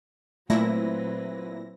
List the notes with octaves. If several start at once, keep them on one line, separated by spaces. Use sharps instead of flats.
A#2 F#3 A3 C4 E4 B4 A#6